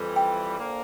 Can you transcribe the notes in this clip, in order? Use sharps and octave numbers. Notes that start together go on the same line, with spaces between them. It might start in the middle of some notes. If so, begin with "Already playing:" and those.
Already playing: F2 E3 G3
G5
D3 F3 A#3